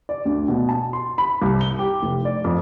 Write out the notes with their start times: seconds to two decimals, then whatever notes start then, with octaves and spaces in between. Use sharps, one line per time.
0.09 D5
0.25 D2
0.48 B2
0.69 A5
0.93 C6
1.18 B5
1.42 C2
1.61 G7
1.79 G4
2.02 F1
2.25 D5
2.44 F2